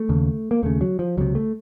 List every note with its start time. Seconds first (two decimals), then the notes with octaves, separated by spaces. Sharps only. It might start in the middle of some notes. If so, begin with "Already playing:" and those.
Already playing: A3
0.09 D#2 C#3
0.51 A#3
0.63 D#2 C#3 A3
0.81 F#3
0.99 F3
1.17 C#2 C3 F#3
1.35 A3